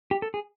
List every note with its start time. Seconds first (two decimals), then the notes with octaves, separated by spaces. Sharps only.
0.11 G4
0.22 A4
0.34 G#4